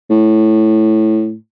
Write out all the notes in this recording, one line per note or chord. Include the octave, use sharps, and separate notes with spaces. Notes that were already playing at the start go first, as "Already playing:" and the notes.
A2